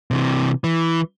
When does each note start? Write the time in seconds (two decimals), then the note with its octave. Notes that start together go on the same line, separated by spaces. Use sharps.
0.11 C3 E3
0.64 E3